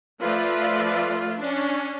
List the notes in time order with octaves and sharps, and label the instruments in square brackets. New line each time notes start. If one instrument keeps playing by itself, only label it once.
[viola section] F3 A3 F4 B4 D5 E5
C#4 D4